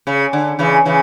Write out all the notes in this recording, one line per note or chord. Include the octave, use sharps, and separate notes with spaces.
C#3
D3
C#3 E3
C#3 E3